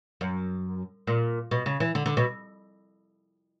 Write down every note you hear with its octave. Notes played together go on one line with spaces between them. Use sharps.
F#2
A#2
B2
C#3
E3
D3
D3
B2